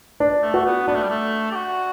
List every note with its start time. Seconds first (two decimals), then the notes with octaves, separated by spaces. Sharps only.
0.20 D4
0.42 A3
0.54 F#4
0.66 B3
0.88 B3 D4
0.95 A3
1.03 G3
1.10 A3
1.51 G4
1.55 F#4